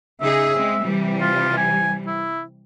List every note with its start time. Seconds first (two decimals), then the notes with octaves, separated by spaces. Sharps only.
0.21 C#3 D#4 G#4 E5
0.56 G#3 C4
0.86 C3 E3 G3
1.21 F4
1.57 G#5
2.07 E4